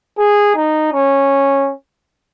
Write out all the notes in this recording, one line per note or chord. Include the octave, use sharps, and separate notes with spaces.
G#4
D#4
C#4